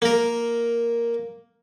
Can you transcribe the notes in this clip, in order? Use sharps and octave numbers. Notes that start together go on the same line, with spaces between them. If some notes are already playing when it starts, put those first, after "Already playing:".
A#3 A#4